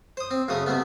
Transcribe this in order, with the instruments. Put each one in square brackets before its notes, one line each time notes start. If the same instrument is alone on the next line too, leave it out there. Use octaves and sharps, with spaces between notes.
[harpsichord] C5 D#6
C4
F#2 C#3 F#3 A3 D#6
C3 G3 A3 B3